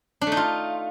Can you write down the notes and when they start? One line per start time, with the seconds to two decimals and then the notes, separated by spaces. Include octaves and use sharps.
0.21 D4
0.27 A3
0.32 D#4
0.37 F4